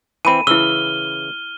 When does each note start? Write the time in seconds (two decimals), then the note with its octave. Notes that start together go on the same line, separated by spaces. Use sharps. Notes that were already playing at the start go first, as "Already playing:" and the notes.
0.25 E3 C4 G#5 B5 D#7
0.47 C#3 E3 E4 E6 F6 G7